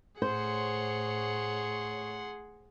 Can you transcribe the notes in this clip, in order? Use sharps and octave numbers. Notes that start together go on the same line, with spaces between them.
A2 G#4 C5 C#5 F#5 C6